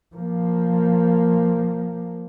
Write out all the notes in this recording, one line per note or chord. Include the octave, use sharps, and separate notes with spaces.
F3 A#3